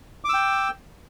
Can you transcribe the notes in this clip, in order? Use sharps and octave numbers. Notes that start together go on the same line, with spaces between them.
G5 D6 E6